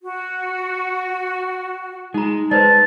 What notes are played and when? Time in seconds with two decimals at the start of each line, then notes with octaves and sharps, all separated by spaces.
0.02 F#4
2.14 G#3 D#4 A#5
2.51 G#3 B4 C5 D5 A5